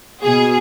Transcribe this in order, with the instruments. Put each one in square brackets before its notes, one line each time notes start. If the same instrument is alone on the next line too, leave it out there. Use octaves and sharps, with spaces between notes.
[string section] B2 G#4